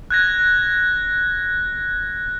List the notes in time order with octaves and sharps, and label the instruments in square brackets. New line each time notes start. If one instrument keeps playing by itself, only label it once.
[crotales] F#6 G#6 A#6